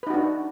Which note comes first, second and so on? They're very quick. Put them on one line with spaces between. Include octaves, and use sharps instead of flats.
B4 D#4 F#4 D4